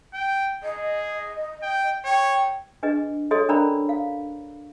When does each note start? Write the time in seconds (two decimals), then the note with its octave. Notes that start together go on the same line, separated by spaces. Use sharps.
0.14 G5
0.63 G#4 D#5
1.62 G5
2.05 C#5 G5
2.83 D4 G#4 B4 D#5
3.31 F#4 G#4 A4 C#5 D#5 C6
3.49 C#4 D4 A#4 D5 A#5 B5
3.89 F5